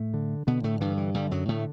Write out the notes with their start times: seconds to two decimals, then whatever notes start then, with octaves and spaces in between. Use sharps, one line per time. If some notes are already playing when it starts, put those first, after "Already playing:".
Already playing: A2 A3
0.14 D3
0.47 B2 D3 B3
0.64 A2 A3
0.81 G2 E3
0.97 E3
1.14 G2 D3 G3
1.31 F#2 F#3
1.48 A2 D3 A3